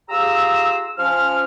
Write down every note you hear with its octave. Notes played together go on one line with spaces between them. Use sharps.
F4 G4 G#4 A#5 E6
F3 C#4 F6